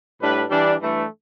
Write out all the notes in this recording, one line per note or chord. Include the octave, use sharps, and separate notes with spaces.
A2 G3 D4 B4
E3 G3 D4
G2 E3 A3 D4